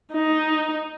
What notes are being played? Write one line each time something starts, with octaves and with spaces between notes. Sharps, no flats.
D#4